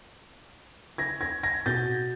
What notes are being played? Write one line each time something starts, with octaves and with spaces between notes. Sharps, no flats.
G#6 A#6
G#6 A#6
G#6 A#6
B2 G6 A6